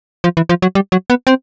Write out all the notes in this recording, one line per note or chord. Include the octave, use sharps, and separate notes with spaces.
F3
E3
F3
F#3
G3
F#3
B3
C4